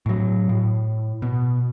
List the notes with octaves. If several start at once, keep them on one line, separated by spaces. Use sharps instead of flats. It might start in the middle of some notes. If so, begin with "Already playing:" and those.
A2 F#3
A2
B2